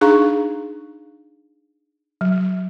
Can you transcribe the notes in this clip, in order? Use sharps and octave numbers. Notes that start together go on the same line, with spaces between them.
D4 D#4 G#4 F5 A#5 C#6
F#3